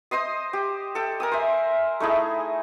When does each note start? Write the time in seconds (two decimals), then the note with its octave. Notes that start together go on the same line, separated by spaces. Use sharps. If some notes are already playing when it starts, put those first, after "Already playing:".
0.11 C5 D#5 C6 D#6
0.53 G4
0.95 A4 G5
1.20 A#4 G#5 D#6
1.32 C5 E5
2.00 A3 D#4 E4 G#4